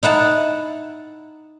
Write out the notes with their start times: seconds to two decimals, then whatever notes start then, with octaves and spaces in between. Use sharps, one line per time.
0.03 D#4 E4 F#5 A5